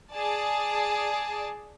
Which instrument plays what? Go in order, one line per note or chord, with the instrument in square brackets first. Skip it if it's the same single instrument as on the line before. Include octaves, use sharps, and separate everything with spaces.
[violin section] G#4 D5 A5